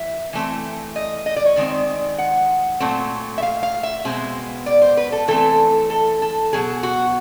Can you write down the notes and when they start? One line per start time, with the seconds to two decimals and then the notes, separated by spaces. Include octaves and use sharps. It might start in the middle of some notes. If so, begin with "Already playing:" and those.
Already playing: E3 E5
0.33 E3 A3 C4
0.96 D#5
1.26 D#5
1.36 D5
1.45 C#5
1.56 D#3 G#3 C4 D5
2.18 F#5
2.80 A#2 F#3 A3 C4
3.38 E5
3.42 F5
3.63 F5
3.83 E5
4.05 B2 G#3 C4
4.66 D5
4.82 C5
4.97 B4
5.12 A4
5.28 E3 A3 C4 A4
5.90 A4
6.22 A4
6.53 B2 F#3 B3 G#4
6.83 F#4